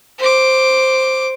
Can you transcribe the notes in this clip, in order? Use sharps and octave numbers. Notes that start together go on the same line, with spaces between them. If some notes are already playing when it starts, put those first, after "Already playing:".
C5 D6